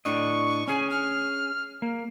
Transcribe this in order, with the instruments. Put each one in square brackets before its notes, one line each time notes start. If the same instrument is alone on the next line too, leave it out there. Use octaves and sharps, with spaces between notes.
[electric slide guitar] A2 D4 D#5 [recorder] C#6
[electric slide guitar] C#4 G#4 [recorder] G#5
[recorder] F6
[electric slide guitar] A#3